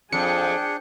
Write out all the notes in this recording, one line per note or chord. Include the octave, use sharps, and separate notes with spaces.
F2 D4 G#4 G5 C#7